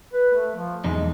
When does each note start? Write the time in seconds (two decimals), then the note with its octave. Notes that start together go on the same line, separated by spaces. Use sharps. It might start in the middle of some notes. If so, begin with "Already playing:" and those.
0.13 B4
0.35 A3
0.56 F3
0.84 B1 E2 G#3 D#4